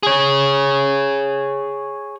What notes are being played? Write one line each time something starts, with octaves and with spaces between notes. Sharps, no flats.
G#4 C#5